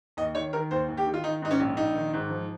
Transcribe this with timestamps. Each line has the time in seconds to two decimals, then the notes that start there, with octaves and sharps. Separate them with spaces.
0.17 D#2 D#5
0.35 D#3 C#5
0.53 D#3 A#4
0.71 D#2 C5
0.89 D#2
0.97 G4
1.06 D#3
1.14 F4
1.24 D#3 D#4
1.42 G#2 D#4
1.51 C#4
1.59 A#1
1.77 A#1 D#4
1.95 D#3
2.13 G#2
2.30 F3